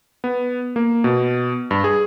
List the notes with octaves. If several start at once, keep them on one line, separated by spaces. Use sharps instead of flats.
B3
A#3
B2
G2
G#4